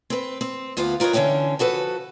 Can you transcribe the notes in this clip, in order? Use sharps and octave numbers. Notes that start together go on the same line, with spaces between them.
C4 B4
C4
D2 B3 F4 F5
F4 A#4 B4 C#5 D#5
D3 E3 C#4 D#4 G5
F3 F#4 A4 B4